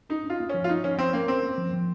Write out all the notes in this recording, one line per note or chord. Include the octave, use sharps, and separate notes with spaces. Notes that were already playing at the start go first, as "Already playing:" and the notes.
C#4 D#4
C#4 F4
A#3
F3 C#4
F4
A#3 D#4
F3 C#4
F3 C4
A#3 C#4
C4 C#4
A#3
F3
F3